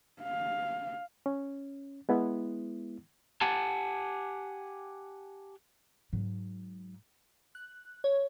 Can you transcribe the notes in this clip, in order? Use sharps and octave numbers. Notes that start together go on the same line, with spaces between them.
F5
C#4
G#3 B3 E4
G4 F#5 G#5 A5
G#2 F#3
F#6
C#5